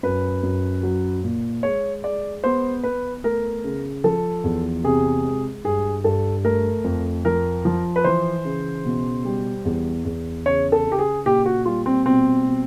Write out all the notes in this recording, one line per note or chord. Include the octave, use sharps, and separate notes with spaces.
F#2 B4
F#2
F#3
A#2
G#3 C#5
G#3 D5
B3 C5
B3 B4
A3 A#4
C#3
F3 A4
E2
C3 G#4
G#3
G2 G#4
G2 A4
A3 A#4
F2
F3 A#4
F3
B4
E3 C5
C#3
B2
G3
E2
E2
C#3 C#5
A4
C#3
G4
G#4
A#2 G4
F#4
G3 F4
C4
B2 C4
B2